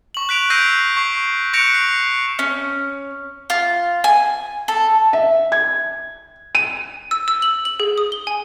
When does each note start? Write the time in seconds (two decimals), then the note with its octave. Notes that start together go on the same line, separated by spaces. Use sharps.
0.14 C#6 F#7
0.29 F#6 B6 D7 F7
0.50 E6 G6 A#6 C7 D7 D#7
0.97 C#6 C7
1.53 C#6 F#6 A#6 C#7 D7 F7
1.75 C7
2.39 C#4
3.50 F4
4.04 G#5
4.68 A4
5.13 E5
5.52 G#6
6.55 D#7
7.11 E6
7.28 E6
7.42 F#7
7.65 F#7
7.80 G#4
7.98 D#6
8.12 G7
8.27 G#5